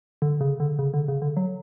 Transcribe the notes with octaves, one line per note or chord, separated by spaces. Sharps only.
D3
C#3
D3
C#3
D3
C#3
D3
F#3